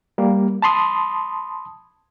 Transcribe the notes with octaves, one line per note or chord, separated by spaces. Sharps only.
G3 A#3
A5 B5 C6 D#6